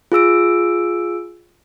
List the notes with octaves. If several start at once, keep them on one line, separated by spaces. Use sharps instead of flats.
F4 G#4 E6 D7